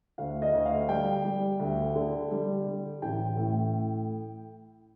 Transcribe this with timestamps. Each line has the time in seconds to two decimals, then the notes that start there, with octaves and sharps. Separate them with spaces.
0.18 D2 F5
0.42 D#5
0.53 D2
0.66 F5
0.89 G3 G5
1.25 G3
1.59 D2
1.95 D3
2.31 G3
2.66 D3
3.02 A1 G5
3.37 A2